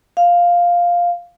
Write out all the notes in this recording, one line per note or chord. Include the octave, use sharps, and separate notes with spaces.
F5